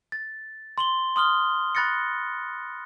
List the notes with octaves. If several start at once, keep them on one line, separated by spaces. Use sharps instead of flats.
A6
C6 F#7 G7
C6 D#6 F6 G7
B5 F#6 A6 A#6 C#7